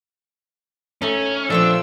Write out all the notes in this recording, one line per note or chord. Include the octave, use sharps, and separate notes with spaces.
A3 C#4 D#4
A#2 F3 A3 C4 D4 F4 G5 E6